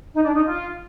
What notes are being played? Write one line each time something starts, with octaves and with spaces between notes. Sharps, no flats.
D#4
D4
D#4
F4